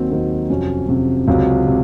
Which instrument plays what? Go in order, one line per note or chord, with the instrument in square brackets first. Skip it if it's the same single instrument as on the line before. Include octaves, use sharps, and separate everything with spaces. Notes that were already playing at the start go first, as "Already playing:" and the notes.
Already playing: [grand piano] D#2 D#3 F#3 C4 F#4
D#2 D#3 F#3 C4 F#4
F2 C3 F#3 C#4
F2 C3 F#3 C#4
C#2 C3 F#3
C3